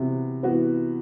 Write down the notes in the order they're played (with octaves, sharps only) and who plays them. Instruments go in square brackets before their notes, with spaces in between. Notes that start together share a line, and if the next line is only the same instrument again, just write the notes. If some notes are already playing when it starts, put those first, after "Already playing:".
Already playing: [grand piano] C3 [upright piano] E3 B3 F#4
[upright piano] E3 B3 F#4 B4